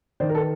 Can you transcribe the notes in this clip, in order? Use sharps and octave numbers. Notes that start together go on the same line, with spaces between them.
D#3 C5 D5
A#4
A4 B4